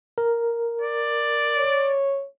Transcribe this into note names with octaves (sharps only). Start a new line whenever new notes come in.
A#4
D5
C#5